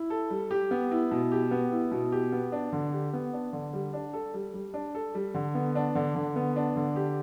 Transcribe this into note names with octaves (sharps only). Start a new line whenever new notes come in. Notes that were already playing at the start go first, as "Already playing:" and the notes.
Already playing: E4
A4
G3
G4
B3
E4
B2
G4
B3
E4
B2
G4
B3
D4
D3
G4
B3
D4
D3
G3
D4
A4
G3
G3
D4
A4
G3
D3
B3
D4
D3
D3
B3
D4
D3
G4